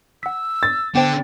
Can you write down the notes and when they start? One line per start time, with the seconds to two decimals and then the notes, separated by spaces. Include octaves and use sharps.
0.23 F#5 E6 B6
0.63 A6
0.95 D3 B3 D4 C5 G5